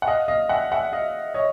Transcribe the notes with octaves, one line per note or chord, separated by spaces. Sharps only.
F#5
D#5 F5
D#5 F5
E5 F#5
E5 F#5
D#5 F5
C#5 D#5